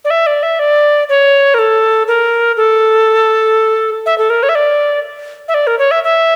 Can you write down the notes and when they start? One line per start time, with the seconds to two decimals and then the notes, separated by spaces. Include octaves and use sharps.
0.05 D5
0.10 E5
0.27 D5
0.43 E5
0.59 D5
1.09 C#5
1.54 A#4
1.59 A4
2.08 A#4
2.57 A4
4.06 E5
4.18 A4
4.30 A#4
4.43 C#5
4.49 E5
4.55 D5
5.48 E5
5.54 D5
5.67 A#4
5.79 C#5
5.91 E5
6.04 E5